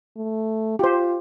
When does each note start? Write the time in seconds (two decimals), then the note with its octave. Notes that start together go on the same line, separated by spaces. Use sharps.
0.17 A3
0.79 F4 G4 C5